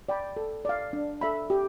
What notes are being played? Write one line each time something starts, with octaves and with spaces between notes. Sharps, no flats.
D5 G5 B5
A4
D5 F5
D4
A4 E5 B5
G4